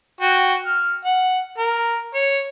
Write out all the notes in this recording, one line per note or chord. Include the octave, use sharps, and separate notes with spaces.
F#4 G5
F6
F#5
A#4
C#5